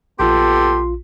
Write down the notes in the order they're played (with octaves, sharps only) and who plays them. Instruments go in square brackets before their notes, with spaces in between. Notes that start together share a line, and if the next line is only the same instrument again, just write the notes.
[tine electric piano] A#1 F4 [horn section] B3 G4 A4 [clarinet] C6